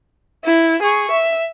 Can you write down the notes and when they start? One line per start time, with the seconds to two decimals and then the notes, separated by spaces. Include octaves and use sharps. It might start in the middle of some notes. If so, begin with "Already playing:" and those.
0.45 E4
0.82 G#4 C#6
1.11 E5